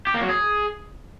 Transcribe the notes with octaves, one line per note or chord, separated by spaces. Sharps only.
G4
A#3
F#3
G#4